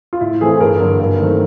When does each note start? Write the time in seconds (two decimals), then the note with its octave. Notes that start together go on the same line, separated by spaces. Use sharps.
0.13 F4
0.21 A2 E4
0.41 E3 A3 C4 G#4
0.60 G2 A#4
0.80 D3 F#3 A#3
0.99 G2 A#4
1.19 D#3 F#3 A3 C4